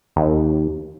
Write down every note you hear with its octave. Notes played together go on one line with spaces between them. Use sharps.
D#2